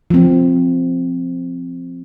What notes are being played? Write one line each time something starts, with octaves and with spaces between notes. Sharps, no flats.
F3 C4